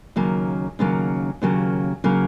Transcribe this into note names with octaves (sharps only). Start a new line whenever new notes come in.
D#2 C#3 F#3 A#3
D#2 C#3 F#3 A#3
D#2 C#3 F#3 A#3
C#3 F#3 A#3